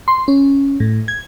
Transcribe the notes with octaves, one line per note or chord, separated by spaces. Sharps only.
C6
C#4
A2
G#6